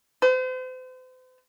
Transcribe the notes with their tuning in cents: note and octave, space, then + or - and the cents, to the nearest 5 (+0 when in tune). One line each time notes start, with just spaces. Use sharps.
C5 -40